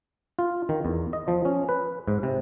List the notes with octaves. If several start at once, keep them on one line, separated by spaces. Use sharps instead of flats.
F4
D#3
E2
D#5
F3
C#4
B4
G#2
C3